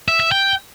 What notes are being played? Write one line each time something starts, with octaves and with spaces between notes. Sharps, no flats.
E5
E5
G5